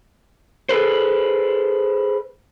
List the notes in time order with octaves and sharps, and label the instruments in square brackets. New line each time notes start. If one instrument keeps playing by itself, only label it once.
[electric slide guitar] G#4 A4 B4 C5